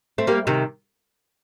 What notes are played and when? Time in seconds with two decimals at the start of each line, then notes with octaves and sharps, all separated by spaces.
0.18 A3 C4
0.27 G3 A#3
0.47 C3 D#3